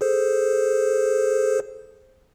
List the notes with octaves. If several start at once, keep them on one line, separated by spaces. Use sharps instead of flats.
G#4 A4 C5